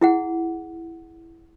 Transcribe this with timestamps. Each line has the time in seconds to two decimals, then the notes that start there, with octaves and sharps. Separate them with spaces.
0.01 E4 G#4 F#5